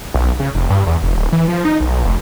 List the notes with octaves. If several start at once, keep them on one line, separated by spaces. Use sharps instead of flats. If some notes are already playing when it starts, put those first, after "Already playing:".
B1
C#3
F1
G2
E2
F1
D1
E3
F3
D#4
B1
F1